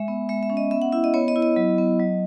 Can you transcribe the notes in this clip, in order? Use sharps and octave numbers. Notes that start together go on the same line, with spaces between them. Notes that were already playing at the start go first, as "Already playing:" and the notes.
Already playing: G#3 E5
B3
G#3 E5
E5
C#4
D#5
B3 E5
F#5
E4 E5
D#5
B3 C#5
D#5
E4
D#5
F#3
B3
F#3